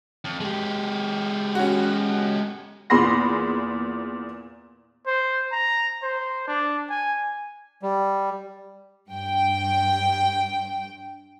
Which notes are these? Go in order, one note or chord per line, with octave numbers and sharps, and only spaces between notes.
F2
G#3 G4
C#4 F#4
E2 A#2 G#4 B5 C6 A#6
C5
A#5
C5
D4
G#5
G3
G2 G5